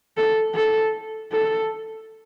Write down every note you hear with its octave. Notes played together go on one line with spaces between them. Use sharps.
A4
A4
A4